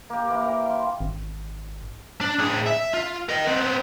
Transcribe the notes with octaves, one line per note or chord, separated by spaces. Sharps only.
A#3 G4
E3 A#3
A#4 G5
F5 C6
G#1
D4
A2 G#4
E5
F4
A#4 D#5
B3 C4